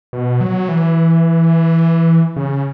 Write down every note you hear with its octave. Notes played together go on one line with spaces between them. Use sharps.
B2
F#3
E3
C#3